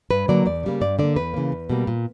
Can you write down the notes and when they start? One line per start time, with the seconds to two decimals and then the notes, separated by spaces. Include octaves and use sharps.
0.11 G2 B4
0.28 D3 F#3 A#3 D5
0.46 E2 D5
0.63 C#3 G3 A#3
0.81 G2 D5
0.99 D3 A#3 D5
1.16 E2 B4
1.34 C#3 E3 A#3
1.52 E2
1.70 B2 G3 A#3
1.87 A#2